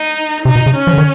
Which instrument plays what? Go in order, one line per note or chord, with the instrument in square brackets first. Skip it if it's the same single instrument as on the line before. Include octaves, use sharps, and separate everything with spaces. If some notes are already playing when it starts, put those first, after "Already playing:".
Already playing: [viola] D#4
[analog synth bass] C3 [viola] D#4
[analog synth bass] B2
C#3
[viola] C#4
[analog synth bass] F3
D3
D#3